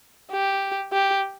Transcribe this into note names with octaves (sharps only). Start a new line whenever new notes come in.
G4
G4